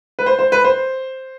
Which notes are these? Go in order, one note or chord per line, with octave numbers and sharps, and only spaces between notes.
B4
C5
C5
B4
C5